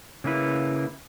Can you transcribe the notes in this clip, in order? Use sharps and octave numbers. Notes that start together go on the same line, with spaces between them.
C#3 A#3 E4 B4